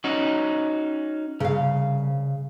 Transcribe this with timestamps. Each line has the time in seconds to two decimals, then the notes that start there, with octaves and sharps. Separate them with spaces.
0.04 C#4 D#4 F#4
1.40 C2 C#3 F5